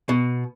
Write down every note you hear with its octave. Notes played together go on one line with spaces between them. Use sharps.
B2